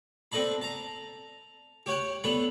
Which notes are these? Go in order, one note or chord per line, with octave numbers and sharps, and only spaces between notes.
C4 D4 A4 D#5 A5 B5
A5 A#5
G4 C#5 F#5 G5
B3 D4 A4 B4